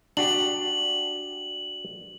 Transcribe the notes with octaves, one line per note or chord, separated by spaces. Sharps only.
D4 F#4 G4 F#7